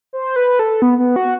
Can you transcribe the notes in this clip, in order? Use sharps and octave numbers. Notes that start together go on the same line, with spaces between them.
C5
B4
A4
B3
B3
F#4